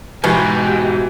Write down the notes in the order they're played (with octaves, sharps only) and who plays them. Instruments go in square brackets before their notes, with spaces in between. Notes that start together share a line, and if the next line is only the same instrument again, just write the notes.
[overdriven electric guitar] G#2 [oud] B2 [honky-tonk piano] E3 [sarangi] G4